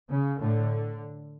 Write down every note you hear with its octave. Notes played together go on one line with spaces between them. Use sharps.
C#3
A2 D3